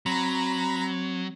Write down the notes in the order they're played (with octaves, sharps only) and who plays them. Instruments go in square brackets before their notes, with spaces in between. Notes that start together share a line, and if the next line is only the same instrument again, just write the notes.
[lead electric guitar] F#3 [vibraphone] C4 [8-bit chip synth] A#5 B5